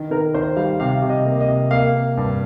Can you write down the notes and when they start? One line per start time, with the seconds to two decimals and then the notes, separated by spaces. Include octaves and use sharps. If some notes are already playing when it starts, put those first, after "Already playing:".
Already playing: D#3
0.11 D#3 A#4
0.34 D#3 C5
0.56 G3 F5
0.80 C3 F5
1.02 C3
1.09 D#5
1.25 A#3
1.41 D#5
1.48 C3
1.71 A#3 F5
1.94 A#3
2.17 G2